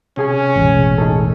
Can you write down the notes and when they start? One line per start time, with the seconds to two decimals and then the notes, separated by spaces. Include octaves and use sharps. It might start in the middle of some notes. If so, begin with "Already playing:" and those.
0.17 C3 C#4 G#4 G#5
0.56 E1 A1
0.98 D#4 G#4 A4